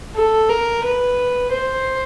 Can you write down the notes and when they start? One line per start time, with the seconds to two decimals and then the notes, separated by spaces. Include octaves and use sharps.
0.15 A4
0.49 A#4
0.84 B4
1.52 C5